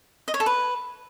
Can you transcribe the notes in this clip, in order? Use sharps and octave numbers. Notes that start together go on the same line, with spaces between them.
D#5
C#5
A4
B4